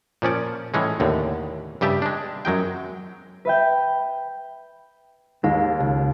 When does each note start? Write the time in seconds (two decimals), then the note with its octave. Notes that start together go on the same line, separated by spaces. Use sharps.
0.22 A#2 F3 C#4 D5
0.74 A2 E3 G#3 C#4
1.00 D#2 A2 D3
1.81 G2 C#3 G4 E5 A5
2.02 G#3 D4
2.45 F#2 F#3 G#3 G5
3.45 B4 E5 G5
5.44 D#2 G#3
5.80 C#2